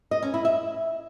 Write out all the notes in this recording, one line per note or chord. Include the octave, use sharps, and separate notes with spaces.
D#5
C#4
E4
E5